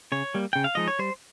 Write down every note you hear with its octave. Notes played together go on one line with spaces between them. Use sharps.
C#3 C#5
G3 A#3
C#3 G5
F5
F3 G#3 D#4 D#5
C#5
G3 C5